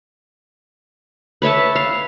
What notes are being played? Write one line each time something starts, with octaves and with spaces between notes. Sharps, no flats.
B4 C#5 E5 A5
F5